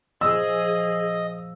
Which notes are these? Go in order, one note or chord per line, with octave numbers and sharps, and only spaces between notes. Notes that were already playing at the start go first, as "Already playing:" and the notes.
A#2 F3 G#4 D#5 E6